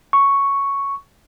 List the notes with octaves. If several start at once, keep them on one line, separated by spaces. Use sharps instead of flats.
C#6